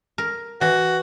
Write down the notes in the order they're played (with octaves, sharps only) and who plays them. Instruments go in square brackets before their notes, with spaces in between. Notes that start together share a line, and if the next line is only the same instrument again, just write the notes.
[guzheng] A#4
[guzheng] E3 [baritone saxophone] F#4